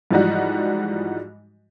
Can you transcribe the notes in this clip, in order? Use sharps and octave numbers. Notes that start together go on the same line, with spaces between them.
G#2 E3 F3 G3 D#4 F#4